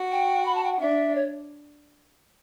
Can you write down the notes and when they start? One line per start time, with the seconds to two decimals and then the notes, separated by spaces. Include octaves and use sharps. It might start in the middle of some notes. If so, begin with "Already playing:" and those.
Already playing: F#4
0.12 G5
0.45 B5
0.55 A5
0.63 G5
0.71 F#5
0.81 D4 E5
1.15 C#5